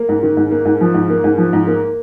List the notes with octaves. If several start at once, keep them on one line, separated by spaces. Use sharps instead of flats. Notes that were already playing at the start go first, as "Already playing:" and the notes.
Already playing: A#3
G#2
D#3
G#2
A#3
G#2
F3
G#2
A#3
G#2
F3
G#2
A#3